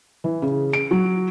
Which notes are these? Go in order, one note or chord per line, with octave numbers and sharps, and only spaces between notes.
E3
C#3
D7
F#3